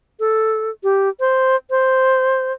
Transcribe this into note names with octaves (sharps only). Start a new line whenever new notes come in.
A4
G4
C5
C5